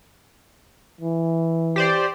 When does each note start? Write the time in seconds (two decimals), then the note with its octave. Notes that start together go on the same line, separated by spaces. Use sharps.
1.01 E3
1.76 G4 C5 D5